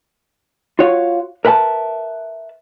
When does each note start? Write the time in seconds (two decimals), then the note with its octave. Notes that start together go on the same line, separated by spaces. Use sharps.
0.79 F4 F#4 C#5 F5
1.45 A#4 B4 E5 G5 A5